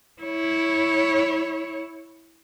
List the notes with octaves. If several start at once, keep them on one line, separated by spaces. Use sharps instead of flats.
E4 C#5